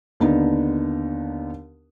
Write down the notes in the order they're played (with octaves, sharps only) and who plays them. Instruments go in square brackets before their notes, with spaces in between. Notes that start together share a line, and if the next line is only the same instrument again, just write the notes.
[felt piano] D#2 D3 B3 D4 D#4